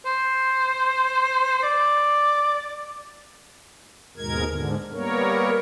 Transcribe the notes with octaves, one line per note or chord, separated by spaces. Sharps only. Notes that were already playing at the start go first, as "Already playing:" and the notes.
C5
D5
D#2 G#2 B2 G#3 A#4 G#6
G#2 D3
G3 A#3 B3 A#4 C#5